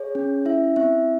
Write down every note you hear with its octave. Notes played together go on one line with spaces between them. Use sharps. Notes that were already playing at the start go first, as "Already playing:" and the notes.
Already playing: G#4 C#5
C#4
E4 E5
C4 E5